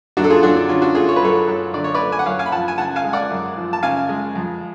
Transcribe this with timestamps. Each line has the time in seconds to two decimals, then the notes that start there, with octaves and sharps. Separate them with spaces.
0.17 F#2 D4 F#4
0.24 A4
0.30 F4 G#4
0.43 F#3 D4 F#4
0.56 D4
0.69 D3 C#4 F4
0.82 D4 F#4
0.95 A3 F4 G#4
1.09 C#5
1.16 B4
1.21 F#2 A4 C#5
1.48 F#3
1.74 D3 D5
1.84 C#5
1.94 B4 D5
2.00 A3
2.12 G#5
2.19 F#5
2.26 F#2 C#5 F5
2.39 F5 G#5
2.46 B5
2.52 F3 F#5 A5
2.68 G#5
2.78 C#3 F#5 A5
2.96 F5 G#5
3.04 G#3
3.13 D5 F#5
3.30 F#2
3.57 F3
3.73 A5
3.83 C#3 F5 G#5
4.09 G#3
4.35 F2